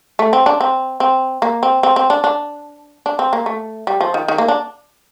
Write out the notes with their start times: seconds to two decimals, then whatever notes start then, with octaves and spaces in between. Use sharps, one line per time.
0.19 A3
0.33 C4
0.46 D4
0.60 C4
1.00 C4
1.42 A#3
1.63 C4
1.83 C4
1.96 C4
2.10 D4
2.24 D4
3.06 D4
3.19 C4
3.33 A#3
3.46 A3
3.87 G3
4.01 F3
4.14 D#3
4.28 D#3
4.38 A#3
4.48 D4